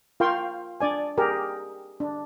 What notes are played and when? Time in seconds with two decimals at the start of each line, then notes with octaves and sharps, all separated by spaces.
0.20 F4 A#4 F5 G5 C6 C#6
0.80 D4 D5 G#5
1.18 G4 G#4 A#4
2.00 D4